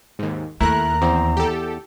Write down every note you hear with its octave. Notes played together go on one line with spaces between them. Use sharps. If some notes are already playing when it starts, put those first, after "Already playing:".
D#2 G#2
D#2 A3 E4 A#4 A#5 F#6
E2 C4
G4 A4